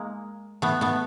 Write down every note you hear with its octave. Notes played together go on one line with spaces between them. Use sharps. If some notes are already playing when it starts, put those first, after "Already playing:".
Already playing: G#3 A#3
A3 B3
A3 B3